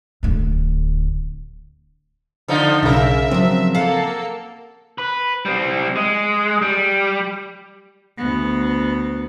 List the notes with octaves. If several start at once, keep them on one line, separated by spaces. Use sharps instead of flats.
D1 D2
D3 F3 D#4
B1 C#3 A#4 E5
F3 F#3 C4
A#3 A4 F5 F#5
B4
G3 C4
G#3
G3
D2 B3